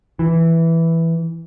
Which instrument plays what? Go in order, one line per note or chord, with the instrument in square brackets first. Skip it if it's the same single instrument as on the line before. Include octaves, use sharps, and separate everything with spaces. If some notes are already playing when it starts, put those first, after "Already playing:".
[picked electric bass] E3